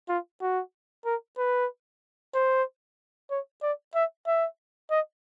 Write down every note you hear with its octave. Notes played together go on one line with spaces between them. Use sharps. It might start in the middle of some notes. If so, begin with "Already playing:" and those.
F4
F#4
A#4
B4
C5
C#5
D5
E5
E5
D#5